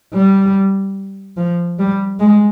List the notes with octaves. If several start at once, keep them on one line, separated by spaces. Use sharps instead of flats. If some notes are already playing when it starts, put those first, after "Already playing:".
G3
F3
G3
G#3